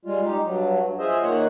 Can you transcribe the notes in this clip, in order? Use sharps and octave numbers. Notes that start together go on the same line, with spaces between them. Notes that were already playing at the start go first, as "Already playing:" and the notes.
G3 G#3 F4
D#4 G4
G2 F#3
F4 G#4 C5 D#5 E5
D#3 A#3 C#5 F#5